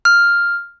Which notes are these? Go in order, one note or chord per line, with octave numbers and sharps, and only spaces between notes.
F6